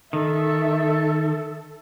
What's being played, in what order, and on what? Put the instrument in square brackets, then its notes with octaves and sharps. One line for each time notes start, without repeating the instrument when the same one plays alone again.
[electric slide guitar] D#3 [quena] A4 [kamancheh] E5